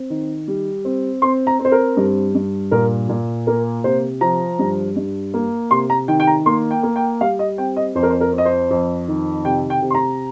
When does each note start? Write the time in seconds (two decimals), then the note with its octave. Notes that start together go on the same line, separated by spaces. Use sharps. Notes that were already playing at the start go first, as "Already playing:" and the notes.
Already playing: C4
0.10 D#3
0.48 G3
0.85 C4
1.22 C4 C6
1.47 A#5
1.59 C4
1.65 C5
1.72 A#4
1.97 G2
2.35 G2
2.71 A#2 A#4
3.09 A#2
3.47 A#3 A#4
3.84 C3 C5
4.21 F3 A#5
4.59 G2
4.96 G2
5.34 A#3
5.71 C3 C6
5.90 A#5
6.08 D#3 G5
6.20 G5
6.27 A#5
6.46 A#3 C6
6.71 G5
6.83 A#3
6.96 G5
7.21 G3 F5
7.39 D#5
7.58 C4 G5
7.77 D#5
7.95 F2 C5
8.03 A#4
8.10 C5
8.21 A#4
8.33 C4
8.38 D#5
8.45 C5
8.70 F2
9.08 D#3
9.45 C3 G5
9.70 G5
9.82 C3
9.90 C6
9.95 A#5